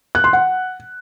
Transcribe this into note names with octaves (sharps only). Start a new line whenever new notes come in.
F#6
C6
F#5